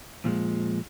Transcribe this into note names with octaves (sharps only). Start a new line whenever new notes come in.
F2 A#2 F3 G3 G#3